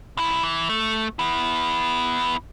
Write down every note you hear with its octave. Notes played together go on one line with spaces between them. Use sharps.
C2 E4
E3
A3
B3 E4